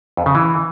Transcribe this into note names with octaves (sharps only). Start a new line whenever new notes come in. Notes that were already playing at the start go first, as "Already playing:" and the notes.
F2
C#3
E3